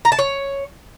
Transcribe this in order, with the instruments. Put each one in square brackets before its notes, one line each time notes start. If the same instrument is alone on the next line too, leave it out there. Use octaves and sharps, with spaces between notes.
[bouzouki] A#5
A5
C#5